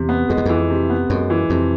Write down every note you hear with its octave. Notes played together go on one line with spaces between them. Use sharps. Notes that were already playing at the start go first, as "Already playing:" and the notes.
Already playing: E2 C3
B3
F2 G#3
E2
F2 E3
C3
B3
F#2 G#3
E3
F2 C3